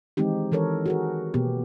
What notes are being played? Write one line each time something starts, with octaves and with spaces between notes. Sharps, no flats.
D#3 E3 G#3 C4 D#4 G4
D#3 E3 A4 A#4 C#5
F#4 G#4 A#4
B2 A#3 B3 G4